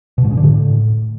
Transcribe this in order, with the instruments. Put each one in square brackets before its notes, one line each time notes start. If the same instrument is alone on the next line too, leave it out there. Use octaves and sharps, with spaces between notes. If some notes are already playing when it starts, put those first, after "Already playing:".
[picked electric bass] B2
G#2
C#3
D3
A2